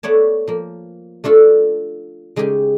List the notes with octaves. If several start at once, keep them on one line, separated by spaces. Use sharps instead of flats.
A3 B3 C#5 D5 A5
F3 A#3
A3 D4 F4 A4
C#3 G#3 D#4 G4 G#4